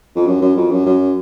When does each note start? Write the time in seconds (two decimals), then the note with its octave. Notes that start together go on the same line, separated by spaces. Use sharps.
0.16 F2
0.27 F#2
0.41 F#2
0.56 F2
0.71 F#2
0.86 F#2